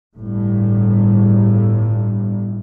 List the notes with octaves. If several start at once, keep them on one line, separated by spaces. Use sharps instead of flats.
G1 A2